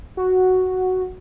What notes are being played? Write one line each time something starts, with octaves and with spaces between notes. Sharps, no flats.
F#4